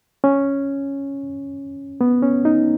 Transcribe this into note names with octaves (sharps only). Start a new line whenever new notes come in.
C#4
B3
C#4
D#4